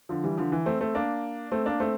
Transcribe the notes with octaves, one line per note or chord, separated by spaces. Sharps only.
D3 F3
E3 G3
D3 F3
E3
A3 C4
A3 C4
A#3 D4
A3 C4
A#3 D4
A3 C4